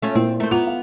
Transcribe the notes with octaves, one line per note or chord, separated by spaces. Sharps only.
A3 C#4 F4
A#2 C4 E4
A3 C5
B3 F4 A#5 F7
F5